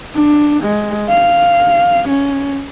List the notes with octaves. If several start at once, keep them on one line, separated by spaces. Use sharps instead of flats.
D4
G#3
F5
C#4